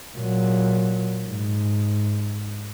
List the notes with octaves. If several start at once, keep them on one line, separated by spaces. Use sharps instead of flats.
A#2 F#3
G#2